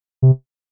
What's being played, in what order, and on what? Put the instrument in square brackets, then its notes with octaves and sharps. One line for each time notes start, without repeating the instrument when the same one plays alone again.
[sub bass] C3